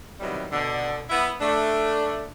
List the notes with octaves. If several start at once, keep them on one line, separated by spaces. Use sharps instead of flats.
C3 D#3 E3 F#3 G3 B3
B2 D3
B3 E4
A3 D4